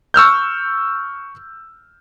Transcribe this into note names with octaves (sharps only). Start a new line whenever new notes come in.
C#6 E6 F6 G6